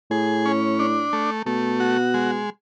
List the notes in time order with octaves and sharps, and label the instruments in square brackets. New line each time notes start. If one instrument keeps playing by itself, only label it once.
[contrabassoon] A2 [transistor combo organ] G#4
[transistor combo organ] C#4
D4
A3
[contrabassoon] B2 [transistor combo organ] A3
[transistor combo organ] F#4
G#3